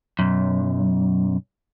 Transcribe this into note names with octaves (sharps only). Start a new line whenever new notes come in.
B1 F#2